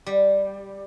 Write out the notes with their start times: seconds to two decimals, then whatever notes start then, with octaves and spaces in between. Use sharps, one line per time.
0.06 G3